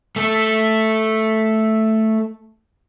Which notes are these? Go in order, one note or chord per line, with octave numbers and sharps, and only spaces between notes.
A3 A4